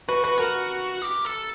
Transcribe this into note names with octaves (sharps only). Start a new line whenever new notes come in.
F#4 B4
F#4 B4
F#4 A#4
G4
A4